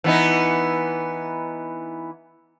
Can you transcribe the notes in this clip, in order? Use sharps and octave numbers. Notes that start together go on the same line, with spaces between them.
E3 B3 D#4